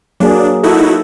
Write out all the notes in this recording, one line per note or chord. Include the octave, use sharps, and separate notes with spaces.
F#3 A#3 D4 G#4
D#4 E4 F#4 A4